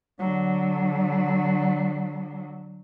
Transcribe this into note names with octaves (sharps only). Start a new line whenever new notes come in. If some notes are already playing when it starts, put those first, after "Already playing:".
D3 F#3